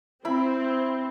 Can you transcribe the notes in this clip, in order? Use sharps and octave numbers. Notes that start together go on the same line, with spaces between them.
C4 E4 B5